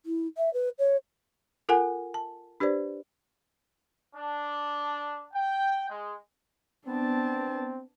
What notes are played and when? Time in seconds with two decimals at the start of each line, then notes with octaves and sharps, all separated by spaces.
0.05 E4
0.37 E5
0.53 B4
0.78 C#5
1.69 F4 A4 A#4 F#5 G#5
2.14 A5
2.60 D4 G4 B4 C5 D5
4.15 D4
5.33 G5
5.89 G#3
6.87 B3 C4 D4 A5